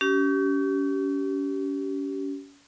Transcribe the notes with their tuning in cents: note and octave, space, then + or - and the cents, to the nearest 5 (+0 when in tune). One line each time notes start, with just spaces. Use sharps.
C#4 +35 G4 -30